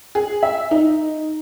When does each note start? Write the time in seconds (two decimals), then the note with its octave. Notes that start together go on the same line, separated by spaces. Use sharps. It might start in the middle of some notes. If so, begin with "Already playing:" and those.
0.15 G#4
0.43 E5
0.71 D#4